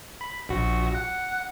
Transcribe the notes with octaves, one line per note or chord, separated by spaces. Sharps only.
B5
A#1 F#4
F#5